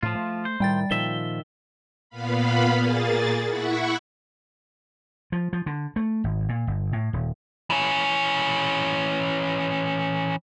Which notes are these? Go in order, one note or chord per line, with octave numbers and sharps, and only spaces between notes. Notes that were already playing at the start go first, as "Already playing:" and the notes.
A2 F3 F4
A3
C5
A2 D#3 G3 G5 A6
A#2 D#3 F3 E5 G7
A#2 B3 F5 B5
A#2 A#3 G#4 A6
E4 F#5 B5 C#6
F3
F3
D3
A3
G#1
A#2
G1
A2
D#1
E3 C#4